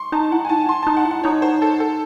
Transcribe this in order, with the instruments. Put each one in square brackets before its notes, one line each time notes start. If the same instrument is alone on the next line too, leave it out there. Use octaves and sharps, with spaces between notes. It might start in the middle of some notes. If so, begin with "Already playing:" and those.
Already playing: [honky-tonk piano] C6 C#6
[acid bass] D#4 [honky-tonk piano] A5
[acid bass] E4 [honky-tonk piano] F#5
[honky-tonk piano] G#5
[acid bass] D#4 [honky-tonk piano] A5
[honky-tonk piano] C6
[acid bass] D#4 [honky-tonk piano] A5
[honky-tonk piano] F#5
[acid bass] E4
[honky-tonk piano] F#5
[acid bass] D#4 [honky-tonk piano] C#5
[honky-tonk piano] C5
A4
A4